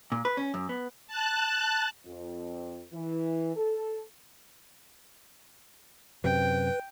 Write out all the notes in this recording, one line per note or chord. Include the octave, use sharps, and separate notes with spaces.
A#2
B4
C#4
F#2
B3
A5 F#6
F2
E3
A4
F#2 C3 B4 G5